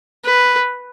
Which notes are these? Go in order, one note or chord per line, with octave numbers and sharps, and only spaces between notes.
B4